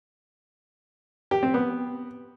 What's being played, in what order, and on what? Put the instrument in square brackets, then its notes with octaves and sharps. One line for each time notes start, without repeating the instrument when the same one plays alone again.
[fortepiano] G4
C4
B3